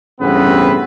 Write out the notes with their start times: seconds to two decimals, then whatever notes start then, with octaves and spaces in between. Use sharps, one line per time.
0.20 A1 G2 C#3 B3 C4 B4